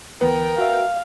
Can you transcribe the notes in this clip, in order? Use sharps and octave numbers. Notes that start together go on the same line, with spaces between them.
D2 E3 B3 A#4 B4 G5
F#4 E5 F5